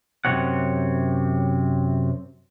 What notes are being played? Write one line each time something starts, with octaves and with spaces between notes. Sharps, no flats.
F#2 C3 E3 C4 C#5 F#5